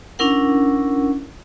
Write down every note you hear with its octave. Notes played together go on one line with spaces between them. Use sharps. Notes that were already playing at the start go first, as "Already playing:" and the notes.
C#4 D4 E4 A#4 F#5